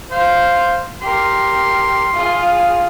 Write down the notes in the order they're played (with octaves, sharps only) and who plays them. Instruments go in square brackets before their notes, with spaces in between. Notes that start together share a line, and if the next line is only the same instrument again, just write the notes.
[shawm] C5 [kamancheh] F5
[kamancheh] G4 A#4 [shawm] C6
[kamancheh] F4 G#4